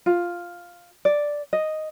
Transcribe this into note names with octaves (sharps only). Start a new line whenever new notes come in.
F4
D5
D#5